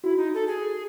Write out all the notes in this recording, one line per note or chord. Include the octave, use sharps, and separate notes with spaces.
E4 F#4
D#4
A4
G#4